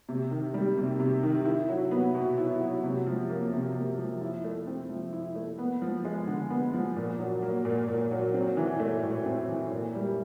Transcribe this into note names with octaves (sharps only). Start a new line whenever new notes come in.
C3
D#3
G3
C3
C3
D#3
E4
F#3
B3
B2
E4
F#3
C3
F3
A#3
C3
C3
F3
E4
A3
C4
F3
E4
A3
B3
F3
G#3
D3
B3
F3
A#2
F#3
A#3
A#2
A#2
F#3
C4
E3
A3
A2
C4
E3
A#2
G3